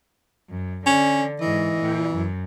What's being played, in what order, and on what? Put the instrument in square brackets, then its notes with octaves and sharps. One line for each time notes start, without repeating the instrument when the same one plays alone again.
[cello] F#2
[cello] D3 [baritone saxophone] C#4
[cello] G#2 D#5 [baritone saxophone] E3
[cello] A#2
F#2